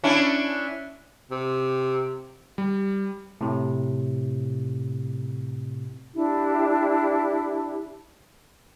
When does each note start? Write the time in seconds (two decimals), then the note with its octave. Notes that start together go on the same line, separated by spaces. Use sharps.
0.04 C#4 D4 E4
1.31 C3
2.58 G3
3.41 A2 C3
6.14 D4 E4 G4